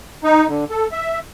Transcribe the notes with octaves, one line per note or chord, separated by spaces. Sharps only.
D#4
D3
A4
E5